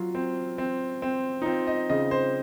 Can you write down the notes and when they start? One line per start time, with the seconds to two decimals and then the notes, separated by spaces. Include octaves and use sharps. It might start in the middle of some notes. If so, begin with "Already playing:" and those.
Already playing: F#3 F4
0.15 C4
0.58 C4
1.02 C4
1.42 D#4
1.45 C4 F4
1.67 D#5
1.90 C#3 D#5
2.11 C5